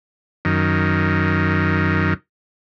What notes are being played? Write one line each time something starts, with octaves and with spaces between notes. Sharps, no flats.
F#2 D#3